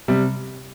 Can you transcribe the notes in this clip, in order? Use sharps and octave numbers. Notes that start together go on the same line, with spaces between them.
C3 G3